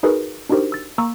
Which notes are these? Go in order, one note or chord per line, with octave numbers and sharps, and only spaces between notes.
D#4 F#4 G#4 A#4 B4
D4 D#4 F#4 G4 A#4 C5
E6 A6
A#3 A#5 C#6 E6